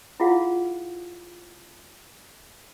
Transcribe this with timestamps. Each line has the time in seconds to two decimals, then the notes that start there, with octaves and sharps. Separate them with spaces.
0.20 E4 F4 G#4 F5 F#5